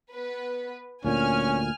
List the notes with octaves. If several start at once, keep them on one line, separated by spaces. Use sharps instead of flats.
B3 B4
D2 A#2 C#4 G#5 F6